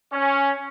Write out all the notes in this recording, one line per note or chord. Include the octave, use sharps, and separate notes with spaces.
C#4